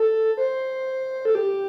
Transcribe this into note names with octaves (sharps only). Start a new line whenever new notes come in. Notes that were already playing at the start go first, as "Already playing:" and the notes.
Already playing: A4
C5
A4
G4